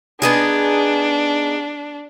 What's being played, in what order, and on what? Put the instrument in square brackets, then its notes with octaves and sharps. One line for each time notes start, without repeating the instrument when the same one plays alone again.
[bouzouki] B3 D#4 G#4 [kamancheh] D4